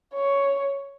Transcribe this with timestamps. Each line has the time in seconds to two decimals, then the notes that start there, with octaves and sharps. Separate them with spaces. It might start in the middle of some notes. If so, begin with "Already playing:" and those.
0.14 C#5